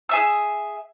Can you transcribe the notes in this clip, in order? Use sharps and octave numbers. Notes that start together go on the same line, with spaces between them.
G#4 E5 E6